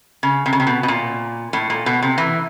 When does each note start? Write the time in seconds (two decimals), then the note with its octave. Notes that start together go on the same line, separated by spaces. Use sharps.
0.23 C#3
0.46 C3
0.53 C#3
0.60 C3
0.67 B2
0.83 B2
0.88 A#2
1.53 A2
1.70 A#2
1.86 B2
2.02 C3
2.18 E3